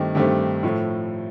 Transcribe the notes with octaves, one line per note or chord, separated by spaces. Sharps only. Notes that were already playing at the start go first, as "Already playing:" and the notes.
Already playing: G2 D#3 A3 C4 G4
G2 D#3 A3 C4 G4
A2 F3 A3